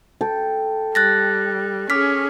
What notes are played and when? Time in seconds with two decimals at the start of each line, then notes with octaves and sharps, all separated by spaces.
0.21 A4 G5
0.95 G3 F#6 A6 A#6
1.90 C#4 G#4 D6 F6 B6